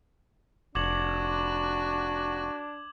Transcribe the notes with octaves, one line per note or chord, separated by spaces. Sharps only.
F1 D4 F#4 D6 G#6 F#7